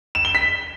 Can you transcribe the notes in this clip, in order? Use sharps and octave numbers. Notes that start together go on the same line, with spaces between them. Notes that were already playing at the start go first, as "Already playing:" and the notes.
E7
G7
B6